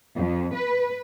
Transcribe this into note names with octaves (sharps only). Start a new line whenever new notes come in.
F2
B4